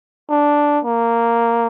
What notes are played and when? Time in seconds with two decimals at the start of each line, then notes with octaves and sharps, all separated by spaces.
0.30 D4
0.85 A#3